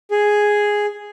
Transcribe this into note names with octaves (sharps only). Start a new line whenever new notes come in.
G#4